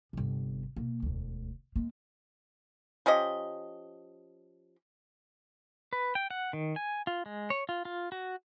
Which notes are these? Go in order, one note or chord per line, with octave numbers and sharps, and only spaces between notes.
G1 C3
B2 A#3
E1 D2
G#3 A#3
F3 C#4 G4 D#5
B4
G5
F#5
D#3
G#5
F4
G#3
C#5
F4
F4
F#4